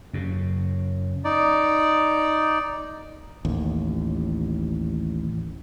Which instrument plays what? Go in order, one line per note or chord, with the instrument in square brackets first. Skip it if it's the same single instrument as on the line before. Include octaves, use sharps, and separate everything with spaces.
[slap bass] F#2 C#3
[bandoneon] D#4 D5
[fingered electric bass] A1 D#2